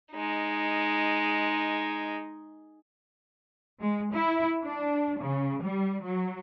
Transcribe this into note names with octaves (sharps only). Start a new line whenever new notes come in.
G#3 D#4
G#3
E4
D4
C#3
G3
F#3